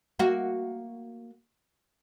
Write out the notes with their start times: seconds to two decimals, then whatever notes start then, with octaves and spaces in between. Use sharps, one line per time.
0.19 A#3 F#4